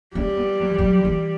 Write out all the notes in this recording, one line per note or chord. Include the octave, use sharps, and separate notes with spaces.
G3 C#4
B3
F#3
E3
F#3
D3
E3